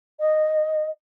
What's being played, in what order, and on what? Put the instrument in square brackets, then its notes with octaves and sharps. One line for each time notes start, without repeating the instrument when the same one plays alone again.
[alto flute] D#5